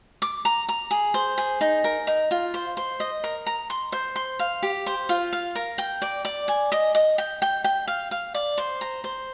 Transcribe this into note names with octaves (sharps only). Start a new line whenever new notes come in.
D6
A#5
A#5
G#4
C5
G#4
D#4
A#4
D#4
F4
C5
C5
D#5
A#4
A#5
C6
C5
C6
F5
G4
C5
F4
F5
A#4
G5
D5
D5
G#5
D#5
D#5
G5
G5
G5
F5
F5
D5
C5
A#5
C5